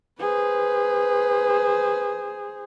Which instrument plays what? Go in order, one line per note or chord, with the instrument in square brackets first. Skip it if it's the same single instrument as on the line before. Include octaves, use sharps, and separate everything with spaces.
[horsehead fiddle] G#4 C5 [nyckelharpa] B4